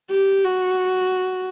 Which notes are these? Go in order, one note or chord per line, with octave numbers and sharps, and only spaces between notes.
G4
F#4